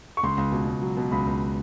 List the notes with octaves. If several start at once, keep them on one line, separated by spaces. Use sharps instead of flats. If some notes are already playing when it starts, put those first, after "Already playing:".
C#6
C#2 C6
C#2
B2
C#2
F#3
B2
C#2 B5
C#2